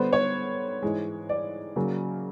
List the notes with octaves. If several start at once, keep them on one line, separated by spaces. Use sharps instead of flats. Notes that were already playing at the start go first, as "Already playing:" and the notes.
Already playing: D3 G3 B3 C5
C#5
G#2 E3 G#3
D5
C#3 F#3 A#3